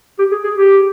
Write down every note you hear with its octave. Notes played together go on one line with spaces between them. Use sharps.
G4
G#4
G#4
G4